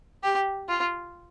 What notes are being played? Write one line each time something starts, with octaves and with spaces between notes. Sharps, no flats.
G4
F4